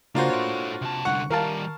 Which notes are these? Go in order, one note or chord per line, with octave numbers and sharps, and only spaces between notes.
C#3 A#3 D4 F4 F#4 C5
A4 C#5
C3 A5
C2 D3 F#5 C#6
D#3 G3 A#4 F5 A5